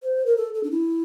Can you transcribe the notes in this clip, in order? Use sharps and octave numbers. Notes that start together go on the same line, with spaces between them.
C5
A#4
A4
A4
D4
E4